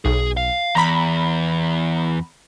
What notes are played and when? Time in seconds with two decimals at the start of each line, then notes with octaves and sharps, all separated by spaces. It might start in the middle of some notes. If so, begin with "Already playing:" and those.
0.05 B1 G#4
0.37 F5
0.75 E2 A#5 B5